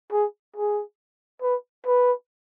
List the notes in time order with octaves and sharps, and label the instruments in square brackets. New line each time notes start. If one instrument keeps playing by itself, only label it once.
[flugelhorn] G#4
G#4
B4
B4